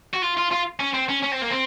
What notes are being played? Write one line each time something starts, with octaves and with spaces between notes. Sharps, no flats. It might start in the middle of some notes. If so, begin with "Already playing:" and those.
F#4
F4
F4
F4
C#4
C4
C#4
C#4
C4
A#3
C4